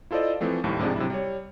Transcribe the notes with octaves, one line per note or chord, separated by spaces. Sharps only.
E4 F4 A4 C5 D5 D#5
E3 F3 A3 C4
D#2 A2 G3
G#2 C3 F3 D4 G#4
C3 F#3 E4
G3 C#5